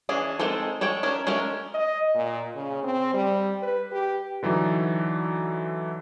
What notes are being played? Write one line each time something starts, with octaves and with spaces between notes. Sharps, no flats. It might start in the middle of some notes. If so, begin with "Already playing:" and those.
E3 C#4 D4 G#4
D#3 G#3 C4 A4
G#3 A4 C#5 G5
C#4 D4 A#4
G#3 A3 C#4 A#4
D#5
A#2
C#3
C4
G3
B4
G4
D3 E3 F#3 D#4